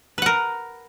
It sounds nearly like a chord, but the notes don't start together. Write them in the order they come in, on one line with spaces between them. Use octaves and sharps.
B4 F#5 A#4